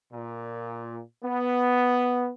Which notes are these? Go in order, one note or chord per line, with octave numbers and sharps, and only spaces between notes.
A#2
B3